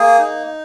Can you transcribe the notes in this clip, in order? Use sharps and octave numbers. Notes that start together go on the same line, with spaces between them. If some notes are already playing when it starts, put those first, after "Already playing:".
Already playing: A#3 G#4
D#4